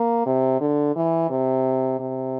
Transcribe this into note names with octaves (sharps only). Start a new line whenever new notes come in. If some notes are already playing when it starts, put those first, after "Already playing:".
Already playing: A#3
C3
D3
E3
C3
C3